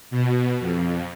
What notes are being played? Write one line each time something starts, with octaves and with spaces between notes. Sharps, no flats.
B2
F2